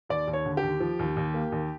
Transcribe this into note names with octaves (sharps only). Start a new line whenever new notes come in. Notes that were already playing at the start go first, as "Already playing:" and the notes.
D#2 D5
D#2
C#5
D3
G4
D#2
F3
D#2
D#2
A#3
D#2